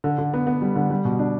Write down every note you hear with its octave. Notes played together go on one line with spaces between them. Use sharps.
D3
D3
B3
B3
G3
D3
G3
B2
D4